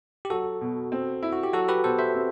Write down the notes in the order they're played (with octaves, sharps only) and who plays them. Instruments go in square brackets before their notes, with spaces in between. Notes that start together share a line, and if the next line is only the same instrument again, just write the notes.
[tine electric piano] G4
[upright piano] F#3 [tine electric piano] F#4 A4
[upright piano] B2
C4
E4
[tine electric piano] F#4
G4
[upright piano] F#3 [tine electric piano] F#4 A4
[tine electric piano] G4 B4
[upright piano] B2 [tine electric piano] A4 C5
[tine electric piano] C5 E5
[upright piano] C4